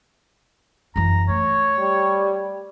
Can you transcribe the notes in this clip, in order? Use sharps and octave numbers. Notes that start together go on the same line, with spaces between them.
F#2 E3 A#5
A3 C#5
G3